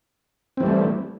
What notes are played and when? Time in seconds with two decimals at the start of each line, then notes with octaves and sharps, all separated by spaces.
0.57 C4
0.60 E3
0.63 G3
0.66 A3